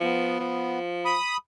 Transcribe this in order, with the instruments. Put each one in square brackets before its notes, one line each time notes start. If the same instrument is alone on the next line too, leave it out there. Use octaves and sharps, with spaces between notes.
[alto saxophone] F3 [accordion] B3
[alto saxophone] F3
[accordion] B5 D#6